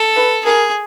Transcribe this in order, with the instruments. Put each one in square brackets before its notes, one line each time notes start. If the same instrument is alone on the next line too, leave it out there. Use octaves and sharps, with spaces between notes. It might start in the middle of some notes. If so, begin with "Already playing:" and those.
Already playing: [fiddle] A4
[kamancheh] B4
[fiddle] G#4 [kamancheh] A#4